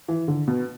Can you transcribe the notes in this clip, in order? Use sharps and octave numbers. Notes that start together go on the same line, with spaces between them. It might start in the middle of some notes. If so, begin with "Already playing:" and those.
E3
D3
B2